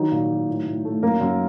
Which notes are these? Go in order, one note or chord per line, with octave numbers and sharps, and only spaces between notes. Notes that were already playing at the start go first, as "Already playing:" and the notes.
Already playing: D#3 F#3 D#4
A#2
F#3
A2
A2
A3
F#2 A#3 A#4
F#2